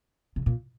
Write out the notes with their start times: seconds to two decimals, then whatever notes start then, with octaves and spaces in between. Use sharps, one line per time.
0.36 C#3
0.46 A#2